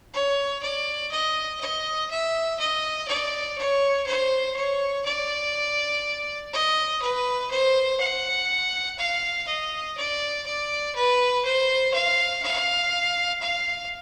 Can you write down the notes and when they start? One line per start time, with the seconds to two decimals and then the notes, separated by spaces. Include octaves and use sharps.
0.14 C#5
0.63 D5
1.12 D#5
1.61 D#5
2.11 E5
2.59 D#5
3.08 D5
3.58 C#5
4.07 C5
4.56 C#5
5.05 D5
6.53 D#5
7.02 B4
7.51 C5
8.00 F#5
8.99 F5
9.47 D#5
9.97 D5
10.46 D5
10.95 B4
11.45 C5
11.94 F5
12.43 F5
13.41 F5